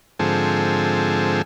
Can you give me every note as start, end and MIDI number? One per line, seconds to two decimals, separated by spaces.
0.19 1.42 44
0.19 1.42 50
0.19 1.42 53
0.19 1.42 60
0.19 1.42 68
0.19 1.42 69